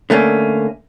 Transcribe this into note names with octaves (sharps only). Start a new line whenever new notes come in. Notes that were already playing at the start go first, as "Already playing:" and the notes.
D3 A3 A#3 C#4